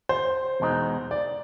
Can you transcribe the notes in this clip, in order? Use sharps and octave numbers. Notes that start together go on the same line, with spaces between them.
C5
E2 B2 G#3 C4 D#4
D5